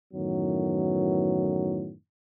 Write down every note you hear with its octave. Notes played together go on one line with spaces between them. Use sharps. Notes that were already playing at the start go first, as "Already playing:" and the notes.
F#2 A2 D#3 E3 F#3 B3